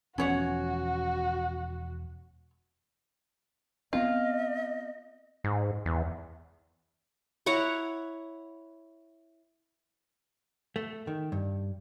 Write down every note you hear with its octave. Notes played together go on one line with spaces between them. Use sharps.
E1 F3 B3 C#4 F#4 C#5 F#5
B3 C4 F4 D#5
G#2
E2
E4 C#5 F#5 A#5
A3
D#3
G2